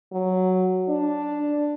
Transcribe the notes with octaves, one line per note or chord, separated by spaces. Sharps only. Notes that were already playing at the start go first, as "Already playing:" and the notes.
F#3
D4